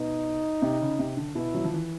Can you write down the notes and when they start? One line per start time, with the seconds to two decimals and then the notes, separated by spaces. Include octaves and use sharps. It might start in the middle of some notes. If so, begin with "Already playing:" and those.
Already playing: B2 D#4
0.62 C3
0.81 C#3
0.99 C3
1.17 D3
1.35 B2 E4
1.54 F#3
1.64 F3
1.74 E3